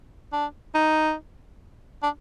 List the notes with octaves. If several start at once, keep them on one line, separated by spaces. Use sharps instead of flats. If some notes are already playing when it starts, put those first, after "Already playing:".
D4
D#4
D4